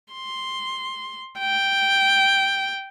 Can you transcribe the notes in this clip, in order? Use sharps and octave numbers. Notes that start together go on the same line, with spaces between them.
C6
G5